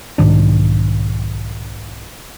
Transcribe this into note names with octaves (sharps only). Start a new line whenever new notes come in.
B1 G#2 D#3 D4